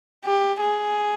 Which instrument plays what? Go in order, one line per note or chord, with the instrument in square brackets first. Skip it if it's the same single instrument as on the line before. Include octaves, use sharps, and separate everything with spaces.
[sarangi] G4
G#4